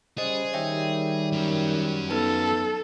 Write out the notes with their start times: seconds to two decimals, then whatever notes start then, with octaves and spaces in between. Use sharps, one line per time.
0.18 C#3 G3 G#4 C5 D#5
0.53 D#3 G3 C#5 E5 G5
1.32 F#3 C#4
2.11 B3 D#4 A4 B4